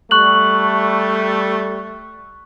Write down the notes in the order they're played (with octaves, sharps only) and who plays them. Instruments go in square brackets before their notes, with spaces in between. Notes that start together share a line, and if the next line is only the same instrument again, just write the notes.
[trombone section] G3 A3 [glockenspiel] C#6 F#6 F#7